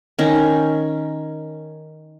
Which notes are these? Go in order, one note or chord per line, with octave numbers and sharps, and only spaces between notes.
D#3 C#4